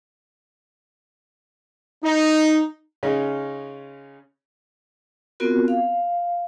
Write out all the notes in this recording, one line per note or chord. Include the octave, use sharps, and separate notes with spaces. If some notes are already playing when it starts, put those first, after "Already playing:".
D#4
C#3 G#3 C#4 D#4
B3 C4 F4 F#4 A#4
F5